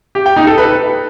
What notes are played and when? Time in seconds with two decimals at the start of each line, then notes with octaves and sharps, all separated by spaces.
0.15 G4
0.26 G5
0.36 D#4
0.47 A4
0.58 B4